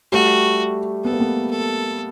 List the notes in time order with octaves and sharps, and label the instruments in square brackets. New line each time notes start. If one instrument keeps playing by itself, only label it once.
[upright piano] G3 A3 [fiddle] F#4
[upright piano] B3 [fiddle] A4
[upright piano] A#3
A3 B3
[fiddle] A4